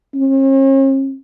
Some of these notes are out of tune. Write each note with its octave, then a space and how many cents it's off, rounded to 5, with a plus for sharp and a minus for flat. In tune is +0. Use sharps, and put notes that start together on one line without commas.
C#4 -45